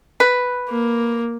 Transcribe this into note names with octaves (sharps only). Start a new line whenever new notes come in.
B4
A#3